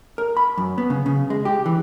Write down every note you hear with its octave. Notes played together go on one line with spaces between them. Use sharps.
A#4
B5
F#2
B3
C#3
C#3
G#3
G4
E3